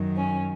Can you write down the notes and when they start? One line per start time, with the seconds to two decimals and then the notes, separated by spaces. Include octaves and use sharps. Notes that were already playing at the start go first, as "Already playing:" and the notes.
Already playing: F#2 D#3 F#3
0.16 C#4